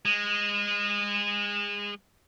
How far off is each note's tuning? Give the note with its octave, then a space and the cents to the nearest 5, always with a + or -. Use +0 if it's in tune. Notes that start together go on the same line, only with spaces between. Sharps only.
G#3 -25